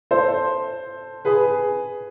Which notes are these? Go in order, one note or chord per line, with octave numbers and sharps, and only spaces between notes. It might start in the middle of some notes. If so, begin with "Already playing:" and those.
A4 C5
G#4 B4